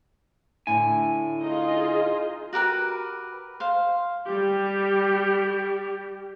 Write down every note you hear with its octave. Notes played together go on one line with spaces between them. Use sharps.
A2 D3 E4 G#5
D#4 F4 G#4 D#5
F#4 G4 A#4 B4
C5 F5
G3 G4